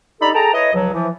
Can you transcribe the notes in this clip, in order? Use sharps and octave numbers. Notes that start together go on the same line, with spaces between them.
D4 D#4 G4 A4 A#5 B5
G#4 A4 G5 A5 A#5
E4 B4 C#5 D#5
C#2 F3 F#3
E3 F3